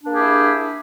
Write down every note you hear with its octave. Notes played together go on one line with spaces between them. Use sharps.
A#3 D4 E4 G4 G#4